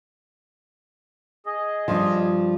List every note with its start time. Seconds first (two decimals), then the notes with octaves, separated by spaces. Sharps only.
1.46 G#4 D#5
1.88 G2 F3